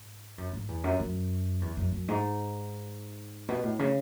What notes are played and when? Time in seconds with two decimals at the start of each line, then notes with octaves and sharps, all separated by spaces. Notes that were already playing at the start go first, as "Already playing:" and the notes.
Already playing: G#2
0.38 F#2
0.53 G#2
0.68 E2
0.84 F#2
1.00 F#2
1.61 E2
1.77 F#2
1.92 F#2
2.08 G#2
3.49 B2
3.63 A2
3.79 C#3